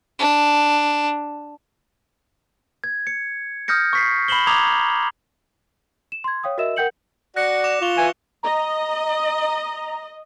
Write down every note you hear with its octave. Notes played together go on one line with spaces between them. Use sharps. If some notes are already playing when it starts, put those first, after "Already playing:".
D4
G#6
C#7
D#6 F6 G6 A#6 C#7
C#6 B6 C7
B5 C7 E7 F#7 G7
A#5 D6 D#6 G#6 F7
E7
C6 G#6
C#5 F5 G5 D#6
F#4 A#4 D#5 E5 E6 E7
A#4 F#5 G5 G6 C#7 F#7
F#4 D5 F#6 A#6 C#7
D6 A#6 E7
F4 C#6 F7 G7
E3 G#5
D#5 A#5